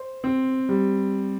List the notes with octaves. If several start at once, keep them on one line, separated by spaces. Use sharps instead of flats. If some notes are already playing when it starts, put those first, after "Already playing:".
Already playing: C5
C4
G3